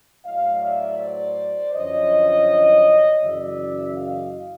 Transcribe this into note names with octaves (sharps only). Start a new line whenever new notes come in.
A2 F#3 D#5 F5
D5 E5
C5 D5
F#2 D3 F3 C#5 D#5
F#2 C#3 E3 D5 E5
D#5 F5